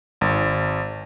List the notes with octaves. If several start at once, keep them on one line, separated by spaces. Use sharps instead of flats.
G#1